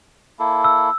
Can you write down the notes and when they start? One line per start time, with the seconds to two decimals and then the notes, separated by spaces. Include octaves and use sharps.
0.39 A#3 E4 A4
0.64 E6